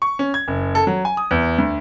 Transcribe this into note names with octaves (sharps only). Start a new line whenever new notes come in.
C#6
C#4
G#6
F#1
A4
F#3
G#5
D#6
E2
D2